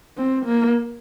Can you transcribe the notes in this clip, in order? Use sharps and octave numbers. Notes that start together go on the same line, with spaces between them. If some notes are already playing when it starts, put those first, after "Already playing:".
C4
A#3